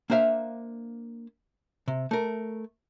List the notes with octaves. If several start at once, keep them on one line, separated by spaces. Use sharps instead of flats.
A#3 D4 C5 E5 F5
C3
A3 A#4